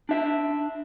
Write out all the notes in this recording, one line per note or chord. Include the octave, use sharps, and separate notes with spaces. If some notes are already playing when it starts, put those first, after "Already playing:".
D4 E5